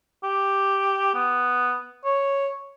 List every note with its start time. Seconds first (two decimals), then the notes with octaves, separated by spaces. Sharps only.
0.23 G4
1.14 B3
2.05 C#5